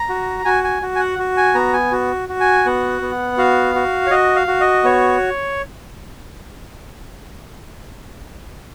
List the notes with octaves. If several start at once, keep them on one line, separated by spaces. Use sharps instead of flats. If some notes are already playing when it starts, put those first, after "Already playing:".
Already playing: A#5
F#4
F#4 G#5
G#5
F#4
G#5
F#5
F#4
G#5
B3 A#5
G#5
F#4
F#4
G#5
B3 F#5
B3
F#4 F5
F#4
C#5
F#4 D#5
F5
F#4
D#5
B3 C#5